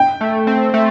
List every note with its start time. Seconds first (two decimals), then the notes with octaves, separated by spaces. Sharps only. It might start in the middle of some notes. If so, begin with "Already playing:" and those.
Already playing: G5
0.21 A3
0.47 C4
0.74 A3